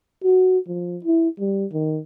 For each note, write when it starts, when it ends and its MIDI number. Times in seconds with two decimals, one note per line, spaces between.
0.24 0.58 66
0.67 0.98 53
1.05 1.29 64
1.40 1.65 55
1.73 2.00 51